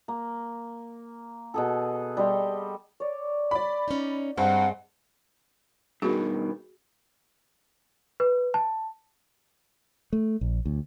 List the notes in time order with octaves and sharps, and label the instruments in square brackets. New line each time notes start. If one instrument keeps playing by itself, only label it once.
[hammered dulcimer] A#3
B2 G#4 A4
G3 D#5 C6
[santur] C#5 D5
[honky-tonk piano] D5 B5 [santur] D6
[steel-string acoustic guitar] C#4 D#4
[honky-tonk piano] G2 [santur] G#3 [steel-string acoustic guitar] C4 [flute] F#5
[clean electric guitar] G2 B2 D#3 [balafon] F#4 G#4
[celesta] B4
A5
[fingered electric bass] A3
A#1
D2